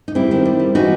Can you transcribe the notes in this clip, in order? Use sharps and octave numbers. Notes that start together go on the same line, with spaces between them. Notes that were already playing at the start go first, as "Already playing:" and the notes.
D#4
G3 C4 E4
D#3
G3
G3
E3 D#4 F#4